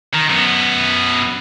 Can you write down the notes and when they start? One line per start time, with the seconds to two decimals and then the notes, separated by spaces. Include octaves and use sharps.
0.15 D#3
0.30 F#2 B3